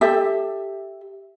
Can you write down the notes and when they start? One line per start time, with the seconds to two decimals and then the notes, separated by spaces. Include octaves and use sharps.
0.01 G4 A4 E5